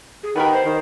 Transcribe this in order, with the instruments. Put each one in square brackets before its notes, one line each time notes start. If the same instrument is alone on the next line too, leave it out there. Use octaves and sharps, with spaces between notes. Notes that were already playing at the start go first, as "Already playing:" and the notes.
[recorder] G#4
[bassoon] D#3 [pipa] B3 G4 A#4 [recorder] B5
[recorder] C5
[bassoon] D#3